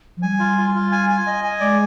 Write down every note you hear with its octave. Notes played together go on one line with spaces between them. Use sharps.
F3
G3 G#5
F4
F4
F4
G#5
G#5
D#5
G#5
G#3 D5